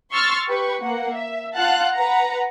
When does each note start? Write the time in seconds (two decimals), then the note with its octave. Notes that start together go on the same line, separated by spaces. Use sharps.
0.12 C6 C#6 E6 F6 A6
0.48 G4 B4 C#6
0.82 A#3 F#5
1.15 E5
1.56 F4 F5 F#5 A5 F#6
1.94 B4 F#5 A#5